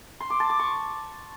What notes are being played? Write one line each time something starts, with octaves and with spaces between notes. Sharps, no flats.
C6
D6
A5
D6
C#6